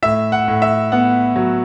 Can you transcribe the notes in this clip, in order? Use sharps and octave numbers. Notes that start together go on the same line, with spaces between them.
A2 E5
F#5
A2
E5
B3 F#5
F#3